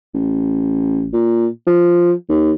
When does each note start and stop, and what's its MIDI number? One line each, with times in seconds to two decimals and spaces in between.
0.14 1.07 33
1.13 1.47 46
1.67 2.12 53
2.29 2.52 39